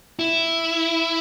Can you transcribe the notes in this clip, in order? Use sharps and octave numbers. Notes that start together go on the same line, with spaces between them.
E4